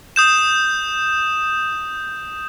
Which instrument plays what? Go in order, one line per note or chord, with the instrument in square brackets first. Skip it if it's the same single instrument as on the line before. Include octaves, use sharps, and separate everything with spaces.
[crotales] D#6 G6 E7